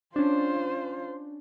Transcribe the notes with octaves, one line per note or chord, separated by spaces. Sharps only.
C#4 D4 F4 C5